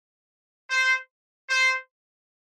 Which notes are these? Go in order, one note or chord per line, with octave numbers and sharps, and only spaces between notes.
C5
C5